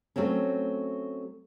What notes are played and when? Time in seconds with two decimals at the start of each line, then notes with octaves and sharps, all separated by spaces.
0.16 F#3 A3 C4 C#4